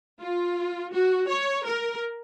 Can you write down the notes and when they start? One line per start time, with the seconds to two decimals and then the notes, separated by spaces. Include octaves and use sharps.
0.19 F4
0.93 F#4
1.28 C#5
1.65 A#4